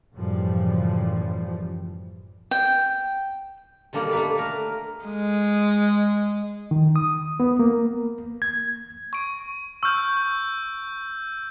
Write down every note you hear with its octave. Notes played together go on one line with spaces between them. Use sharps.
F#2 A2 C#3 E3 F3 G3
G5
B2 D3 G3 A#3
A3 A#3 B4
A#4
G#3
D#3
D#6
B3
A#3
G#6
C#6 D7
C#6 E6 F6 G6